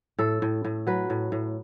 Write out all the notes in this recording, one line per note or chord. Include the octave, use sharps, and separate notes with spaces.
A2 A4
A2
A2
F#3 B4
A2
A2